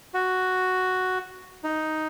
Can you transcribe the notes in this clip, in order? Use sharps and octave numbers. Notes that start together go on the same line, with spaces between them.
F#4
D#4